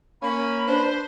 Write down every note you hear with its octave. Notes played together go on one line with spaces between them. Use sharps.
A#3 C#4 B5
D4 B4 C5